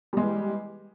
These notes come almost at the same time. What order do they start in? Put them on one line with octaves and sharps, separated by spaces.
G3 G#3 E3